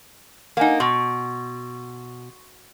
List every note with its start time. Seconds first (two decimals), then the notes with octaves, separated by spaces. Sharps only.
0.57 A#3 D#4 F#5 G#5
0.80 B2 C6 C#6